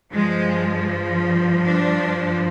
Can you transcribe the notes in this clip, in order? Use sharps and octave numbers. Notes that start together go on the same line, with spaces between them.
G2 F3 G#3
D4